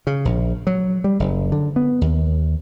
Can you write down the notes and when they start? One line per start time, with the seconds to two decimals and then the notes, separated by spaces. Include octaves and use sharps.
0.07 C#3
0.25 A#1
0.67 F#3
1.04 G3
1.20 F#1
1.52 D3
1.76 B3
2.01 D#2